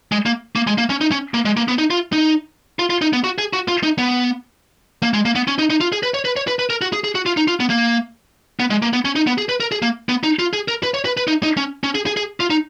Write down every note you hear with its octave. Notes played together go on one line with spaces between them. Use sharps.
G#3
A#3
A#3
G#3
A#3
C#4
D#4
C#4
A#3
G#3
A#3
B3
D#4
F4
D#4
F4
F4
D#4
B3
F#4
G#4
F#4
F4
D#4
B3
A#3
G#3
A#3
B3
C#4
D#4
D#4
F4
G#4
B4
C#5
B4
C#5
B4
B4
A#4
F#4
G#4
G#4
F#4
F4
D#4
F4
B3
A#3
B3
G#3
A#3
B3
C#4
D#4
B3
G#4
B4
A#4
G#4
A#3
B3
D#4
F4
G#4
A#4
B4
C#5
B4
B4
D#4
D#4
C#4
C#4
G#4
G#4
G#4
F4
D#4